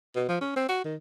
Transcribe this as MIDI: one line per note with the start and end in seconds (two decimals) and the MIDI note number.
0.16 0.28 47
0.29 0.37 53
0.41 0.54 61
0.56 0.66 60
0.69 0.83 66
0.85 0.96 51